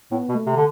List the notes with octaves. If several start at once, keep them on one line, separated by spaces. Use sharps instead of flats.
A2 B3
B2
A3
C3
D3